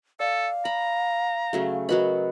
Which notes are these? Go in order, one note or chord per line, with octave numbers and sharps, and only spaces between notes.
A4 D5 F5
A#5 B5
C#3 F#3 A3
F#3 F#4 A#4 B4 D#5 B5